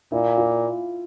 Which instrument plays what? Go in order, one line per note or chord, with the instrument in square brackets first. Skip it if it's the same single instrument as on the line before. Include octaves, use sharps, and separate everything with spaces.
[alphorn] A#2 [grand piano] E4
[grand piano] F4